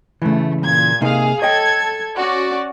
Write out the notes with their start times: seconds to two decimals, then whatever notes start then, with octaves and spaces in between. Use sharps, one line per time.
0.22 C#3 E3 A3
0.61 A#2 G#6
1.02 C3 A#3 D#4 G#4 F5
1.42 A4 C#5 D#5 G5 G#6
2.18 C#4 F#4 D5